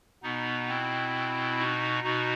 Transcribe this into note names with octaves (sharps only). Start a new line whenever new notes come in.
B2 B3 D#4
C4 E4
D#4 F#4
B2 D#4 F#4